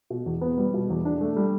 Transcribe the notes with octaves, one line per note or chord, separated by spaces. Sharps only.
B2
E2
B3
G3
B2
E2
D4
A3
G3